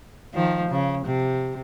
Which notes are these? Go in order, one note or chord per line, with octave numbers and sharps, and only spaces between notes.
D#3 F3
C#3
C3